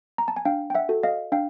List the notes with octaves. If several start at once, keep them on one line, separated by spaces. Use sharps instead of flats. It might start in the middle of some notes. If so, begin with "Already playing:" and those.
A#5
A5
G#5
D4 F5 G5
G5
E5 F#5
F#4 A4
D#5 F5
D4 F5 G5